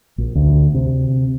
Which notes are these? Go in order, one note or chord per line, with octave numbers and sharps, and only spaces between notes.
A#1
D2
C3